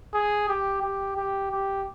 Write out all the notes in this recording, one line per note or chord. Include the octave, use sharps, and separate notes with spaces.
G#4
G4
G4
G4
G4